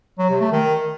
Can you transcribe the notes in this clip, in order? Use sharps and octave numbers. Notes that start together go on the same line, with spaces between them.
F#3
C3
A3
D#3